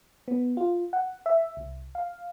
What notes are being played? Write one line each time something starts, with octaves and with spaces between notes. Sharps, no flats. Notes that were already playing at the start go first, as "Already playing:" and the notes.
B3
F4
F#5
E5
C2
F5